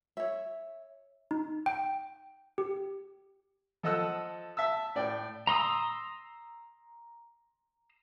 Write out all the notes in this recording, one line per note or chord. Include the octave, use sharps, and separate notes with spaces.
C#5 E5
D#4
G5
G4
F3 A4 D#5 F#5 E6 F#6
E5 A5 E6
A2 D5 G5
A#5 C6 D#6 E6